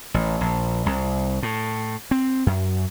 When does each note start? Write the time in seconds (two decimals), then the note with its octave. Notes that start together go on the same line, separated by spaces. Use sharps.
0.14 A1
0.41 A#1
0.86 C2
1.43 A2
2.11 C4
2.46 F#2